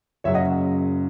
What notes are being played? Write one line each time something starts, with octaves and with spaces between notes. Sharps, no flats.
F#1 F#2 C#3 C#5 E5
D#5 F#5